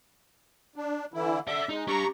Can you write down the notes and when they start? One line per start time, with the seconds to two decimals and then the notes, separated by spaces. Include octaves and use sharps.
0.76 D4
1.14 D3 E3 E4
1.47 D5 E5 F#5
1.69 G#3 D#4
1.88 D4 G4 A#5 C#6